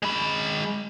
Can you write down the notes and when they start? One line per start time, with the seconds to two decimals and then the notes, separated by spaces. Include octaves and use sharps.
0.02 G#3 B5